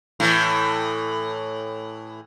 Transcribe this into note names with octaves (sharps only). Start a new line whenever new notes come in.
A2 E3